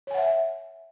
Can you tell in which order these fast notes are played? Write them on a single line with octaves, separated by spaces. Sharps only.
C#5 G#5 F#5 E5